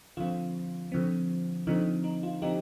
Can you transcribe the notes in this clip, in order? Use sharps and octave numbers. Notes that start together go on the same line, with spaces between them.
D3 F3 C4 F4
D3 F3 C4
D3 F3 C4 D#4
D#4
F4
D3 F3 C4 D#4 G4